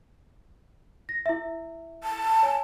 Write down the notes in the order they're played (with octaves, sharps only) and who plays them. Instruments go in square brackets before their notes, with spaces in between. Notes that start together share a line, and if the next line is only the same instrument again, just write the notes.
[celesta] A#6
E4 E5
[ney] A5
[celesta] C#5 G#5